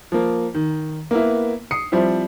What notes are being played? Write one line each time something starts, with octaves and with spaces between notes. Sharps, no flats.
F3 A#3
D#3
A#3 B3 E4
D#6 C7 C#7
F3 G3 C4 E4